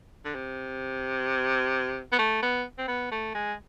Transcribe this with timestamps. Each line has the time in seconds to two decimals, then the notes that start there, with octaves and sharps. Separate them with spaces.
0.25 D3
0.34 C3
2.12 B3
2.19 A3
2.42 B3
2.78 C4
2.88 B3
3.11 A3
3.34 G#3